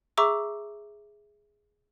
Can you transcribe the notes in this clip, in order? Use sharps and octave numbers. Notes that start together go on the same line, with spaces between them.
G#4 E5 A#5 C#6 D6 E6